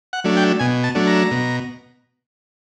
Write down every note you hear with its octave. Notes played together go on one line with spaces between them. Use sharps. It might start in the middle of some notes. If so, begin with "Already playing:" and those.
F#5
F#3 A3 D4
G5
B2 G#5
A5
F#3 A3 D4
A#5
B2